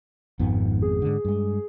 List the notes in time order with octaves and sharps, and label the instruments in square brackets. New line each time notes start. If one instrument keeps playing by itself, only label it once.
[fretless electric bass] G#1 F2 B3 [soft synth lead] G#2
[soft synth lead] G#4
[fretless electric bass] G#2 D3
G2 G#3